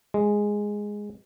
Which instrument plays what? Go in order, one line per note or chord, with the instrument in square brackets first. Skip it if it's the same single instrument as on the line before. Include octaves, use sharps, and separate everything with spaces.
[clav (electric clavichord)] G#3